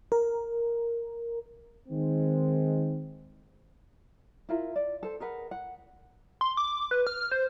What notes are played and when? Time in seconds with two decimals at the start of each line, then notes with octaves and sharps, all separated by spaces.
0.12 A#4
1.88 D#3 G#3 C4
4.49 E4 F4 A#4
4.76 D5
5.03 A4 C5
5.20 G#4 A#4 B4 F#5
5.51 F#5
6.41 C6
6.57 D6
6.91 B4
7.07 F6
7.31 C5